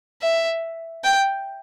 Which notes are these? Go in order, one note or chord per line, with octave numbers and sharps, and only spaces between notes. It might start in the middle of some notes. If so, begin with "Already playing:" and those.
E5
G5